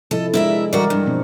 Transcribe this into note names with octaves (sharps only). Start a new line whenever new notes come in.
C3 F3 E4 A4 D#5
G#3 D4 E4 A#4 E5
E3 G3 F#4 A#4 D5
G2
B2 F3 C4